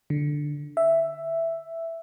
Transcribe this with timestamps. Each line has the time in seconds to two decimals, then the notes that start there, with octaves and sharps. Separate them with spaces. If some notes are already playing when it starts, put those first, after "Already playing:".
0.10 D3
0.77 E5